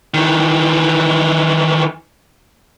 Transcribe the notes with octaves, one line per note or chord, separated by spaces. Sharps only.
D#3 E3